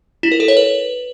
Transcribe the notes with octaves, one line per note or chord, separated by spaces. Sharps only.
E4
A#4
A4
C#5
B4